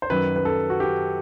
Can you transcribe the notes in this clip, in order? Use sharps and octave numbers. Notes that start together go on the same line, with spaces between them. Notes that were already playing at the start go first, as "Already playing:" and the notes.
C5
F#2 D#3 F#3 B4
B4
A4
F#4
G4